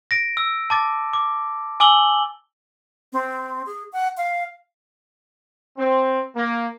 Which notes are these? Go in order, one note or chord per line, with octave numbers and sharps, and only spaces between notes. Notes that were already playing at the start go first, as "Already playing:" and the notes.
A#6 D7
E6
A5 D6 A6
D6
G#5 D6 E6 F#7 G7
C4
G#4
F#5
F5
C4
A#3